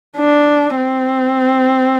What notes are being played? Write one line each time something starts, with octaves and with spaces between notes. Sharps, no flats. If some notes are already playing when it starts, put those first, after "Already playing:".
D4
C4